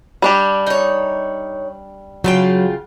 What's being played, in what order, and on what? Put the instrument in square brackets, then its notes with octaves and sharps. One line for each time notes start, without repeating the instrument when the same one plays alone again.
[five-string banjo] G3 D4 G4
[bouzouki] D#4 C#5
[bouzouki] C#3 F4 G5 [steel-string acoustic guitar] F#3